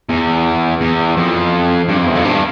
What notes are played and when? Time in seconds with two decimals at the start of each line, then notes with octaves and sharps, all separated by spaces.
0.09 E2
0.81 E2
1.17 F2
1.89 G2
1.97 F2
2.06 E2
2.15 F2
2.24 G2